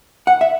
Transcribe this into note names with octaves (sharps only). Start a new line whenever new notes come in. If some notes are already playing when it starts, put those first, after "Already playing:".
F#5
E5